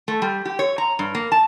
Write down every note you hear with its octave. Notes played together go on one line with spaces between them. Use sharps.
A3
G3
G4
C#5
A#5
G2
A#3
A5